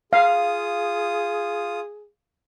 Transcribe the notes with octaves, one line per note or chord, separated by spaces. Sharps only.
F4 G#4 F5 D#6